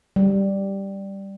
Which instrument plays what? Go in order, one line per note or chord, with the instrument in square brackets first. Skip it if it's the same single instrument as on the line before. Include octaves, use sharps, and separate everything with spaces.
[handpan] G3